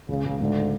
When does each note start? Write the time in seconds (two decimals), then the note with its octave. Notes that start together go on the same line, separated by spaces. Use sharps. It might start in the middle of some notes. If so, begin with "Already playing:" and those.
0.09 C#2 C#3
0.25 C#2
0.40 D2 G#2 D3